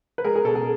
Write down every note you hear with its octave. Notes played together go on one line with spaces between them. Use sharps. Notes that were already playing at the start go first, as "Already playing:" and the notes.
B4
G#3 G#4 A#4
G#4 A#4
B2 A4
G#4